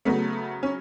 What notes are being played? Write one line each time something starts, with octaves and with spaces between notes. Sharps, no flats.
C#3 F#3 A3 B3
C#4